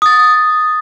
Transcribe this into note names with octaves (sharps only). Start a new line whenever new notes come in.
D#6 A6